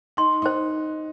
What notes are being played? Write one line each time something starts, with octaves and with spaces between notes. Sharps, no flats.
D#4 C6
D#4 C5